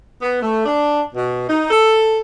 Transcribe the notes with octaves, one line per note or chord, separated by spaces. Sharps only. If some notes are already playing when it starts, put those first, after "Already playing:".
B3
A3
D4
B2
D#4
A4